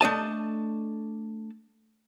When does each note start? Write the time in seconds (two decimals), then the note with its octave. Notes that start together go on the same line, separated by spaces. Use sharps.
0.01 A3 D4 D#5 A5